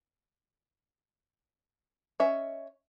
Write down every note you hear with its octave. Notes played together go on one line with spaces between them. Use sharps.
C#4 D#5 E5